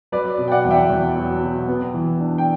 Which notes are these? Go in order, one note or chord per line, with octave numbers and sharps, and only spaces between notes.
F#3 B4 D5
B2
G5
D5 F#5
E2
E5 G5
E2
F#3
B2
B3
E3
D4
G5